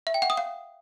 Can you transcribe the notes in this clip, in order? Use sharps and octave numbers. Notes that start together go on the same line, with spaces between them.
E5
G5
F#5
D#6
F5